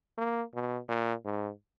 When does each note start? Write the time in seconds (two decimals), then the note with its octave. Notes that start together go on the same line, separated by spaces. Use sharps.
0.18 A#3
0.54 B2
0.89 A#2
1.25 G#2